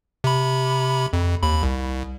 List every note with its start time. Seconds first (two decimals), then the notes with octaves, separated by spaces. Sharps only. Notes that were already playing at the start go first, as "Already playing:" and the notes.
0.24 C3 B5
1.13 F2
1.43 D#2 B5
1.63 C2